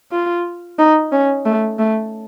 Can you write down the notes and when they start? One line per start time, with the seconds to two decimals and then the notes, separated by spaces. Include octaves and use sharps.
0.11 F4
0.79 D#4
1.12 C#4
1.45 A3
1.79 A3